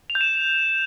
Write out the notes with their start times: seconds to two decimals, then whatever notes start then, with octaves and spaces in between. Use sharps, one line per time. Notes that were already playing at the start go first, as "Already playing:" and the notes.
0.10 F7
0.15 G6
0.21 E7